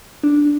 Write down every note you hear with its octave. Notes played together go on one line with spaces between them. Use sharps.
D4